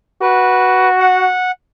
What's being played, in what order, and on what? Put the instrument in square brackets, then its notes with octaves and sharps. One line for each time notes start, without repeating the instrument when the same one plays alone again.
[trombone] F#4 [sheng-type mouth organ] B4
[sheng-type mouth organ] F#5